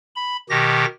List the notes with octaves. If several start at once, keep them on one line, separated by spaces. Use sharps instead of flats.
B5
B2 D#3 G4 A#6